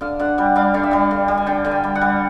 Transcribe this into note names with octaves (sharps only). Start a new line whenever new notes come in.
D3 F5
D3 F#5
G3 F#5
G3 F5
D3 F5
E5
G3 F5
D3
G3
G#5
D3 G5
D3 G#5
G5
G3
F#5
G3